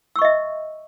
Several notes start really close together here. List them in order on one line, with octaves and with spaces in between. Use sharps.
E6 C#6 D#5 E5